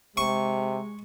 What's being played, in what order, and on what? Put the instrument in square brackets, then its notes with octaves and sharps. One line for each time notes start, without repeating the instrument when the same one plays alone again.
[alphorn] C3 [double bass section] G#3 [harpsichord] C#6